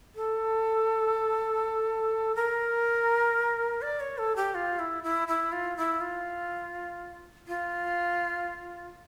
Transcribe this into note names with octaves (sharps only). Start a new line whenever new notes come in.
A4
A#4
D5
C#5
A4
G4
F4
E4
E4
E4
F4
E4
F4
F4